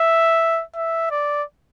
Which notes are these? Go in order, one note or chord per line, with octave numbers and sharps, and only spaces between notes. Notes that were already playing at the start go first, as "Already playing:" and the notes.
Already playing: E5
E5
D5